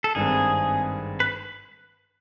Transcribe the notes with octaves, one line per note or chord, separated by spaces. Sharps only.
A4
G#1 G2 D#3 G#3 C4 G#4
B4